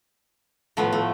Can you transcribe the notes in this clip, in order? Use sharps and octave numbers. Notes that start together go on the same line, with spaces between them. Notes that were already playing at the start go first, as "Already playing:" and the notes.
A2 F3 A3 B3
A3